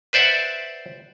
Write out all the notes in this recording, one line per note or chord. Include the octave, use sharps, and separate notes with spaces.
B4 C5 D5 E5 F#5